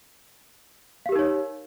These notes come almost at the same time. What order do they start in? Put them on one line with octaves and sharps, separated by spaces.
F5 G4 A#4 D#4 C#5